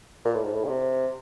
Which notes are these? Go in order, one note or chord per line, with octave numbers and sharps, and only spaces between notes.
A#2
A2
G#2
A2
C#3
C3